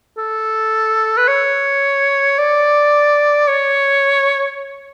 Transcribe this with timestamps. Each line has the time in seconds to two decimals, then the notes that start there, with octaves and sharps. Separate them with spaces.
0.18 A4
1.17 B4
1.28 C#5
2.38 D5
3.48 C#5